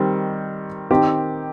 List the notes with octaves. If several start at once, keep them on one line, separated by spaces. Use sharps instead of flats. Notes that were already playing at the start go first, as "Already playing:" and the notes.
Already playing: D#3 G3 C4
D#3 C4 G4